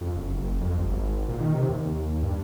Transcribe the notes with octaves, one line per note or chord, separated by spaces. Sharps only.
F2
F#1
F#1
F2
G1
G#1
A#2
D#3
C3
D#2
G2